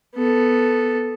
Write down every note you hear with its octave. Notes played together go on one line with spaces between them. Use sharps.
B3 A4